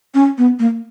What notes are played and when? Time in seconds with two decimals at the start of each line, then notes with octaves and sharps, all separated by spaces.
0.14 C#4
0.38 B3
0.59 A#3